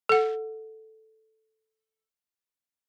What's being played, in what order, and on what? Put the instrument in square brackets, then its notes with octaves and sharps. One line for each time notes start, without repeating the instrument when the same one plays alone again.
[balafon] A4 F#5